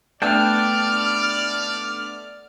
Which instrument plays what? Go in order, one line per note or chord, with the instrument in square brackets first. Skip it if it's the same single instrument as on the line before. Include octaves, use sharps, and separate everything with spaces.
[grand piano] A3 B3 D4 [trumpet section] D5 [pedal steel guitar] G5 A5 F#6 [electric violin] F6